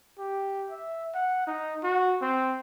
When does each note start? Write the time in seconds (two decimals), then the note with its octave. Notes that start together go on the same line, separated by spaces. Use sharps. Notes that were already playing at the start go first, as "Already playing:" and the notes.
0.19 G4
0.70 E5
1.14 F#5
1.47 D#4
1.83 F#4
2.22 C4